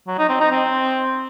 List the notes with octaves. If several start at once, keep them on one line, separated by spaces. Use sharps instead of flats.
F#3
D#4
C4
D#4
C4